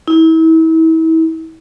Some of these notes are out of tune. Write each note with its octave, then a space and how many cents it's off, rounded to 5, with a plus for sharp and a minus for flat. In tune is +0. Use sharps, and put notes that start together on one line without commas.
E4 -35